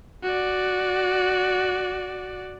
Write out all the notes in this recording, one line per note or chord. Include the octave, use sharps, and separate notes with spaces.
F#4 D5